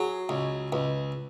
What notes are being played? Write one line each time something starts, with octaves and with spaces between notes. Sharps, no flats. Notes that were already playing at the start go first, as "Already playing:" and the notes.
Already playing: F#3 G#4
C#2
C#2 B4